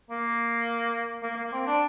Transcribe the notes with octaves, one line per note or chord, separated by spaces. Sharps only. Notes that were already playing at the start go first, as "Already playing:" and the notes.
A#3
A#3
A#3
C4
D4